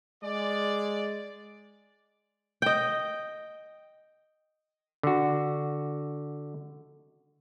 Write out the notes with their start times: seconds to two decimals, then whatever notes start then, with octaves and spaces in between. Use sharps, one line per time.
0.22 G#3 D5
2.62 D#5 G5
5.03 D3 F#4